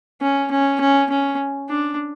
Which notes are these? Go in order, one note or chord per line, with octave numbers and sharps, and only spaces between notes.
C#4
C#4
C#4
C#4
D4